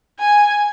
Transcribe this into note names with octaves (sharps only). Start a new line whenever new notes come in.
G#5